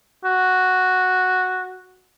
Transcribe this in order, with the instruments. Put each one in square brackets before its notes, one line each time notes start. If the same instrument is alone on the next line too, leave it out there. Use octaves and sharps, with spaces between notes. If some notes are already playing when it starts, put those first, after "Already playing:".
[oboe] F#4